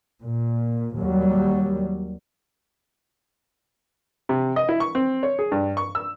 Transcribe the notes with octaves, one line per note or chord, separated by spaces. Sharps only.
A#2
D#2 F#3 G3
C3
D#5
E4
C#6
C4
C#5
G#4
G2
C#6
E6